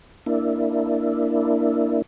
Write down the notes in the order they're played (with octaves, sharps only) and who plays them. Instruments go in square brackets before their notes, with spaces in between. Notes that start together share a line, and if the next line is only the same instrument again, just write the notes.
[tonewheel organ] A#3 D4 E4